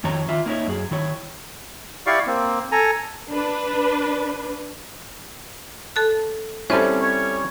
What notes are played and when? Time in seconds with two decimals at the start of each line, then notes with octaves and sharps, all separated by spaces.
0.04 F2 D#3 E4 C#5 A#5
0.28 D#3 F4 E5
0.46 A#3 D#4 E4 C#5
0.67 F#2 G#4
0.91 D#3 E4 C#5
2.06 E4 G4 D5 F5 C#6
2.27 A#3 C4
2.72 A4 G#5 A#5
3.32 D4 B4
5.96 A4 A5 F#6
6.70 G3 C4 C#4 E4 A4 C5
7.02 C#5